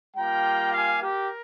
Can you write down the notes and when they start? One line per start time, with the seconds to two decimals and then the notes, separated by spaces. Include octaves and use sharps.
0.16 G3 A#3 F4 G5 A#5
0.72 F5 G#5
1.00 G4 A#4